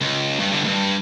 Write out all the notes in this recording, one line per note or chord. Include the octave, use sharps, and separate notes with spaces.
C#2
G2
G2 D3
C#2 G2